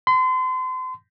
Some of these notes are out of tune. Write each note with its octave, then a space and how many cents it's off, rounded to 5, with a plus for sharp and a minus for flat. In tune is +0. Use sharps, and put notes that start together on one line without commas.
C6 -35